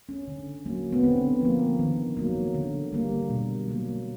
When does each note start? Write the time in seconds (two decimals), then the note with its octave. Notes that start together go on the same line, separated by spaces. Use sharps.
0.09 C#4
0.28 D3
0.65 F#3 A#3
0.92 B3
1.03 D3 C4
1.41 F3 A#3
1.79 D#3
2.17 F#3 A#3
2.54 D3
2.92 G3 A#3
3.30 B2
3.68 F#3 A#3